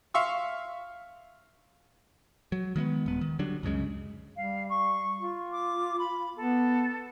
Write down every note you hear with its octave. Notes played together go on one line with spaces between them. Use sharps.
E5 F5 C6 C#6 E6
F#3
D#3 G#3 A#3 B3
D#1 B3
D#3
D3 F#3 G3 D4
C#2 F#2 C#3 G#3
G3 F5
C#6
F4
D6
B5
B3 A4